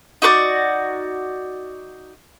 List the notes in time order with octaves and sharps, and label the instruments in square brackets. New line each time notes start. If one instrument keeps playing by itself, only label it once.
[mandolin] D#4 F#4 B4 D5